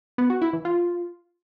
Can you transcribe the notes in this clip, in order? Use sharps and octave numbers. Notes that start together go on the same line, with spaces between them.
B3
F#4
E4
E3
F4